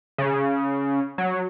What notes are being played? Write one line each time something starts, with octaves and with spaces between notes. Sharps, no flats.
C#3
F#3